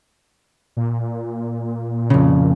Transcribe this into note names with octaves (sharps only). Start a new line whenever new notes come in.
A#2
F2 C#3